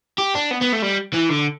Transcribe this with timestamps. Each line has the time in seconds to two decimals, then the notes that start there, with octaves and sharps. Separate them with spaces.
0.18 G4
0.35 D4
0.51 B3
0.61 B3
0.72 A3
0.82 G3
1.14 E3
1.30 D3